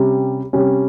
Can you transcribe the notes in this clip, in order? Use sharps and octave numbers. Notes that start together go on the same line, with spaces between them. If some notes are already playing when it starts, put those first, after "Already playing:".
Already playing: C3 G3 C#4
C3 G3 C#4